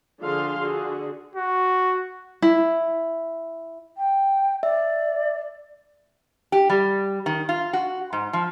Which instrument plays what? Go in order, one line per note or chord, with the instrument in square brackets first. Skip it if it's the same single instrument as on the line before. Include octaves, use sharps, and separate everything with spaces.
[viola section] D3 F3 D4 G#4 F5 C6
D3 F#4 G#4
[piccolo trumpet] F#4
[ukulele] E4
[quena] G5
[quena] D5 [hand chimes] E5
[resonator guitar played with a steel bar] G4
G3
D#3
F4
F#4
G#2
F3